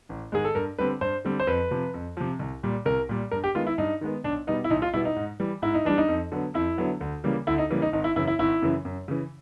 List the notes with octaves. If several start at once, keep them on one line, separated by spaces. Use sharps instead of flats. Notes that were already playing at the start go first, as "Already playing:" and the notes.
A1
G#2 D#3 G#3 G#4
A4
G2 A#4
D3 G3 C4 B4
G2 C5
D3 G3 C4
C5
F2 B4
C3 F3
F2
C3 F3
C2
A#2 G3
C2 A#4
A#2 G3
G2 A#4
G4
D#3 G#3 B3 F4
E4
G2 D#4
D#3 G#3 B3
B1 D4
B2 G3 B3 D#4
E4
B1 D#4
F4
B2 G3 B3 E4
D#4
G#2
E3 G3
G#2 E4
D#4
E3 G3 D4
D#4
F2
D3 F#3 B3
F2 E4
D3 F#3 B3
D2
C#3 E3 G3 A#3
D2 E4
D#4
C#3 E3 G3 A#3
D#4
G#1 D#4
E4
F#2 C#3 E3 E4
E4
G#1 E4
F#2 C#3 E3
F#2
C#3 E3